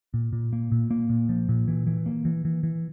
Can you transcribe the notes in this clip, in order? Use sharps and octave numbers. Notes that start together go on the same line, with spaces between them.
A#2
A#2
A#3
A#2
A#3
A#2
F3
A#2
E3
E3
A#3
E3
E3
E3